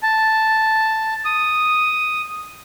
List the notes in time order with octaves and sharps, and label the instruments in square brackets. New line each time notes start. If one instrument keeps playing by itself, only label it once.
[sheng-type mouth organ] A5
D#6